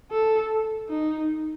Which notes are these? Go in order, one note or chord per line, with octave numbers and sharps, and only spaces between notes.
A4
D#4